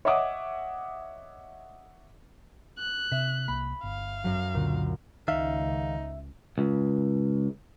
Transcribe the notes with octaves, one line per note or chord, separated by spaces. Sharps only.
C#5 D#5 E5 F#5 D6 D#6
F#6
C3 E5
C2 A#3 B5
G1 F5
F#2 F#3
C#2 A#2 D3
C#2 D#3 D#4 E5 F5
C#2